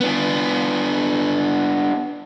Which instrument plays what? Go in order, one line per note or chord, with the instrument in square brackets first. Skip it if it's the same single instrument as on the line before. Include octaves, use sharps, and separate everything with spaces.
[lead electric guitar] B3 D4